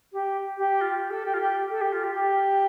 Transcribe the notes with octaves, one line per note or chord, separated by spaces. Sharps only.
G4
G4
F4
G4
A4
G4
F4
G4
A4
G4
F4
G4
G4